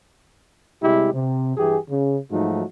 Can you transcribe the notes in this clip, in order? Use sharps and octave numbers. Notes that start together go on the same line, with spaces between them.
C3 G3 G#3 E4 G4
C3
G2 E3 G4 G#4
C#3
G#2 F3 F#3 A3 D#4 F#4